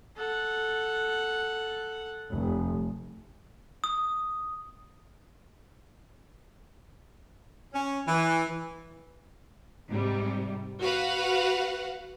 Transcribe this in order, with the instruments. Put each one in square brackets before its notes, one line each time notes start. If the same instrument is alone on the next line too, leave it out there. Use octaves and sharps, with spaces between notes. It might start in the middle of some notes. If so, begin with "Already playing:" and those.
[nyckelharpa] A4 F#5
[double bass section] F1
[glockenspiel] D#6
[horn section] C#4
E3
[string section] G#2 C3 G3
F#4 B4 F5 F#5